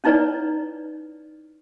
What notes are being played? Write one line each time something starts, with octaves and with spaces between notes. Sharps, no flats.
C#4 D#4 E4 B4 C#5 D5